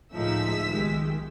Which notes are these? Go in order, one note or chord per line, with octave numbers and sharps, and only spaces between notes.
C#2 A2 F3 D#4 G#4 E5 E6 B6
B1 D#3 G#3 G4